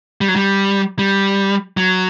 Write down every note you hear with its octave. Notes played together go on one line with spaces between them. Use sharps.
G3
F#3
G3
G3
F#3